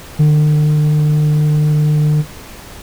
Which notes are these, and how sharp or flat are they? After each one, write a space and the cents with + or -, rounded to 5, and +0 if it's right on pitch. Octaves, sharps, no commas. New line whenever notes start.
D3 +45